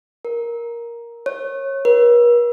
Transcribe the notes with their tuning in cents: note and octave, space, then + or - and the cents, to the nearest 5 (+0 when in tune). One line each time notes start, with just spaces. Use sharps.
A#4 +10
C#5 -25
A#4 +45